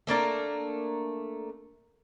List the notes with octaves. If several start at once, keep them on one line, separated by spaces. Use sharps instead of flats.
A3 A#3 D4 A#4